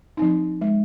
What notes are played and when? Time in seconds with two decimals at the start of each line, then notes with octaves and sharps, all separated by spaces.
0.17 F3 C4 D#4
0.61 G#3